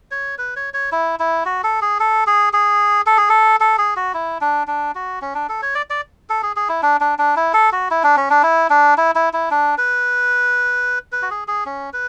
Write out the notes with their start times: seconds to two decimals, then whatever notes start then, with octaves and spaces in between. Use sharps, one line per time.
0.11 C#5
0.38 B4
0.56 C#5
0.74 C#5
0.92 E4
1.20 E4
1.45 F#4
1.64 A4
1.82 G#4
2.00 A4
2.27 G#4
2.53 G#4
3.06 A4
3.18 G#4
3.30 A4
3.60 A4
3.78 G#4
3.96 F#4
4.14 E4
4.41 D4
4.67 D4
4.95 F#4
5.22 C#4
5.35 D4
5.49 A4
5.62 C#5
5.75 D5
5.90 D5
6.29 A4
6.43 G#4
6.56 G#4
6.69 E4
6.83 D4
7.01 D4
7.19 D4
7.36 E4
7.54 A4
7.72 F#4
7.91 E4
8.04 D4
8.17 C#4
8.30 D4
8.43 E4
8.70 D4
8.98 E4
9.15 E4
9.33 E4
9.51 D4
9.78 B4
11.12 B4
11.22 F#4
11.31 G#4
11.48 G#4
11.66 C#4
11.93 B4